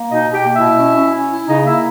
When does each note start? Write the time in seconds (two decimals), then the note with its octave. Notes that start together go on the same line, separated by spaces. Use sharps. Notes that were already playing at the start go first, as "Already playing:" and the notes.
Already playing: A#3
0.09 B2 D#4 D#5
0.27 B2
0.32 G4 G5
0.44 A#3
0.55 E4 E5
0.61 B2
0.78 C#4
0.96 C#4
1.13 C#4
1.31 E4
1.47 C#3 D#4 D#5
1.65 A#3 E4 E5